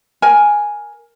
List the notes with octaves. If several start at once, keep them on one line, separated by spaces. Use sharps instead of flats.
A#4 G#5